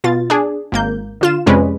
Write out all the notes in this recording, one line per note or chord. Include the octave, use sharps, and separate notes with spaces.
B2 F4 A6
D4 G#4
G#1 A#3 G6
D3 F4 E7
F2 C3 G#3 C#4 B4 D5